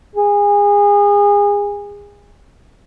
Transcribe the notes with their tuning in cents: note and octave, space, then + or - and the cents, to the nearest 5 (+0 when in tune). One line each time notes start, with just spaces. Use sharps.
G#4 -30